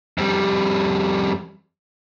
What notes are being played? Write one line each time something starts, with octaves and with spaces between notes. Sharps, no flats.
F2 G3